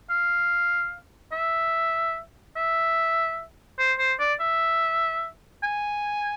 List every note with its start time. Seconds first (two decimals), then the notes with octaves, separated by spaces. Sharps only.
0.09 F5
1.32 E5
2.56 E5
3.78 C5
3.99 C5
4.19 D5
4.40 E5
5.63 G#5